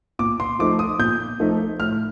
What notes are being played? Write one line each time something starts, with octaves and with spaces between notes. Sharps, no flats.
A#2 D6
C6
F3 A3 D#4 D6
D#6
A#2 G6
F3 A3 D#4
A2 F6